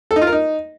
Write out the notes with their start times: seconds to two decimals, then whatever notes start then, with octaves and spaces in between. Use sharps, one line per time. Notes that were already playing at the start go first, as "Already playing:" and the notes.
0.11 A4
0.16 D#4
0.22 F4
0.27 A#4
0.32 D#4